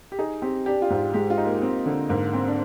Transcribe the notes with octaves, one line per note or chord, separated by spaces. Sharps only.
G4
D#4 G#4
C4 G4
D4 G4
F4
G#2
G#3 G4
F4
D#4
A#3
C4
D3
G#2 A#3
C4
D4